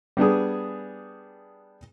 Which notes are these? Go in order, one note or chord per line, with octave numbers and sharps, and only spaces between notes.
G3 B3 D4 G#4